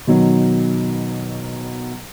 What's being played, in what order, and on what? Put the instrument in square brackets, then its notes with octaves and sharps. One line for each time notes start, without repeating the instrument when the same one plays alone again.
[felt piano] B2 D#3 F#3